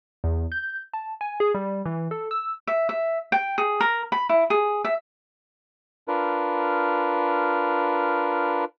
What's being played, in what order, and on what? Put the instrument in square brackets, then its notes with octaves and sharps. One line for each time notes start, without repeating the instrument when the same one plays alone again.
[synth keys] E2
G6
A5
G#5
G#4
G3
E3
A4
E6
[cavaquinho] E5
E5
G5
G#4
A#4
B5
E4
G#4
E5
[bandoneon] D4 F4 A#4 B4